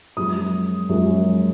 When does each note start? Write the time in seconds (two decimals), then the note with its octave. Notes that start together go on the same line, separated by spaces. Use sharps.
0.17 F#2 F3 G#3 D#6
0.89 F#2 F3 G#3